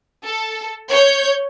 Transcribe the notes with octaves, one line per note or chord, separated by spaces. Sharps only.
A4
C#5 G6